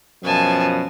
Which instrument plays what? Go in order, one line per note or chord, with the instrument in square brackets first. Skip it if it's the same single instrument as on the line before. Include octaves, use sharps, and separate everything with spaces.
[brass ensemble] F#2 B2 F3 [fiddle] G#5 A5